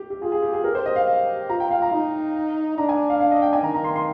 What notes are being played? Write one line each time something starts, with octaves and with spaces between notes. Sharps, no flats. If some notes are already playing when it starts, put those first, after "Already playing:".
Already playing: G4
G4
F4 G#4
G#4
G4
G#4
G4 A#4
C5
D#5
F5
F4 A#5
G5
F5
A#5
D#4
D4 A#5
G#5
F5
F5
D#5
G5
G#5
D#3 A#5
A#5
C6
C6